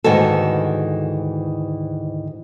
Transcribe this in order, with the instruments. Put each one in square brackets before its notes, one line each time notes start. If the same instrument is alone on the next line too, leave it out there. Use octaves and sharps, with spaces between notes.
[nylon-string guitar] D2 G#2 D#3 E3 F#4 A4